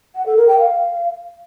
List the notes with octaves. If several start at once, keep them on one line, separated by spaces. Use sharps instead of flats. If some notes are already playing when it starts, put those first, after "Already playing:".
F#5
A4
A#4
G5
F5